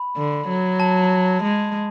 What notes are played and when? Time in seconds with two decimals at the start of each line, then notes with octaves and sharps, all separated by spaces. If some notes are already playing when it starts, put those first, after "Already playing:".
Already playing: B5
0.17 D3
0.48 F#3
0.80 A5
1.43 G#3